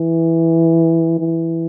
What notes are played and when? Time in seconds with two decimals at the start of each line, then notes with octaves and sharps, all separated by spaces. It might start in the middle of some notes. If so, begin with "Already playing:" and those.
Already playing: E3
1.19 E3